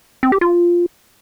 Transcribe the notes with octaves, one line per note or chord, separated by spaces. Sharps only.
C4
G4
F4